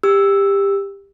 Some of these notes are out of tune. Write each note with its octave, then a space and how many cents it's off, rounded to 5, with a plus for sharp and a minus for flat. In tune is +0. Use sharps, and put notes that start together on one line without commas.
G4 +20 E6 +0